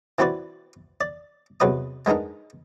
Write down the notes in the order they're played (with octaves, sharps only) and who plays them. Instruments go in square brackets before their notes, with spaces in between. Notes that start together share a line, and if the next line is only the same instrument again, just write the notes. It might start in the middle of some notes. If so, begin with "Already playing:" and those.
[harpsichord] E3 C4 F#4 B4 D5
D5
E2 C3 F#3 B4 D#5 D#6
G#3 B3 D4 D#4 A#4